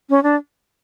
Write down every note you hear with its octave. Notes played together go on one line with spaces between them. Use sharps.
C#4
D4